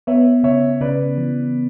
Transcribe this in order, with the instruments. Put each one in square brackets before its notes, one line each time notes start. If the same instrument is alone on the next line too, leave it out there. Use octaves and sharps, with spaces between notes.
[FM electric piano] B3 [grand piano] C#5 E5
[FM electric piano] C#3 [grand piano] C#5 E5
[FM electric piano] C#3 [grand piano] B4 D5
[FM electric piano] E3